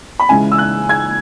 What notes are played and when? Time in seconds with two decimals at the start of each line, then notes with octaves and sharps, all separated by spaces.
0.20 B5
0.29 C#2 C#3 E3 G#3 G#5
0.52 E6
0.58 F#6
0.89 G#6